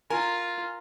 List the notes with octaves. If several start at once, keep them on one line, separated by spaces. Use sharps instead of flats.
F4 A#4 G#5